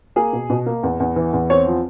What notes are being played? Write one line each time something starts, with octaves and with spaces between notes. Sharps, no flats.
A#3 G#4
B2
B2
A#3
E2
E2
E3
E2
C4 C#5
F3